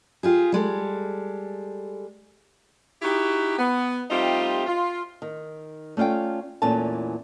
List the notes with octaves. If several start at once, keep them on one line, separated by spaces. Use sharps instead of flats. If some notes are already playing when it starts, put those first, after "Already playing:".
F4 G4 G#4
G3 G#3 A4
D#4 E4 F#4 G4
B3
G3 A3 C4 D#4 F4 G4
F4
D#3
A3 C#4 F4 D5 G5
E2 A#2 E3 A3 C#4 A5